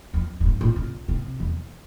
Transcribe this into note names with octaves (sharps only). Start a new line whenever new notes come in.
F2
G#2
G2
A#2
C#3
C3
E2